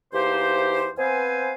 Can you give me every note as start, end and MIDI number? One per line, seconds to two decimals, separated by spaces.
0.13 0.91 40
0.13 0.91 58
0.13 0.91 63
0.13 0.91 67
0.13 0.91 72
0.98 1.54 59
0.98 1.54 60
0.98 1.54 71
0.98 1.54 72
0.98 1.54 77
0.98 1.54 80